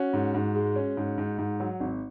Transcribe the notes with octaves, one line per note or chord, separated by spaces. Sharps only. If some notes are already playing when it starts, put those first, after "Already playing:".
Already playing: C#4 F#4
G#2
G#2
G#3
C#4
G#2
G#2
G#2
F#3
G#1